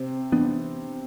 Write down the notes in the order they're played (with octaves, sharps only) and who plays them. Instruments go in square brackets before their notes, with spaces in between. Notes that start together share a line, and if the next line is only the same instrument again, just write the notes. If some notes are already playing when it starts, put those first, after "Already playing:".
Already playing: [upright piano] C3 C4
[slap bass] E3 B3 D4